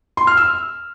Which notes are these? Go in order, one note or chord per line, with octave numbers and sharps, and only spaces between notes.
C6
F6
E6